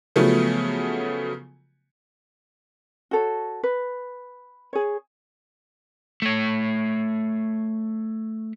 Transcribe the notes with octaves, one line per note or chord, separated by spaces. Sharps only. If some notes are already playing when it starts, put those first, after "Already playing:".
C#3 F3 F#3 A3 B3
F#4 A4 C#5
B4
G#4 C#5
A3 C#5